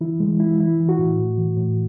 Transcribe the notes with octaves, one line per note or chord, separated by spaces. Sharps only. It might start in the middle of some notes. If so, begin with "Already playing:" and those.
E3 E4
E3 G#3
E3 E4
E3 E4
E3
F#4
A2
A2
E3
A2